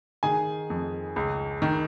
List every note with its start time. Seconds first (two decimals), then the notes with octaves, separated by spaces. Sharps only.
0.23 D#3 G#4 G#5
0.70 F2
1.16 C#2
1.62 D#3